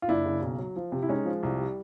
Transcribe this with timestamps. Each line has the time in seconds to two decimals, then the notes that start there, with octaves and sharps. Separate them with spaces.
0.02 F4
0.08 F#1 D4 E4
0.25 C#3
0.42 B1
0.58 F#3
0.76 F3
0.92 C3
1.03 E4
1.09 G#3 C#4 D#4
1.25 F3
1.43 C2
1.58 G3